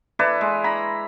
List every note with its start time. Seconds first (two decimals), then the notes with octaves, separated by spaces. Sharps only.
0.19 E4 A4 B4 D5
0.41 G#3
0.64 A#5 B5